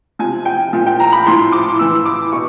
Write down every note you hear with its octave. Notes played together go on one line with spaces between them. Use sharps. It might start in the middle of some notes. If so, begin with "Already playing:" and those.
C3 F3 G#5
G5
A#2 F3
G5
A#5
B5
A2 F3 C6
D6
A2 E3 E6
D6
B2 C#6